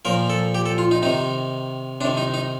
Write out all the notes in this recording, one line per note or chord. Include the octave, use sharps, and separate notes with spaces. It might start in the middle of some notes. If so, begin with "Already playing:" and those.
A#2 F3 A#4
A4
G4
A4
F4
D#4
C3 D#3 D#4
C3 D#3 D4
D#4
D#4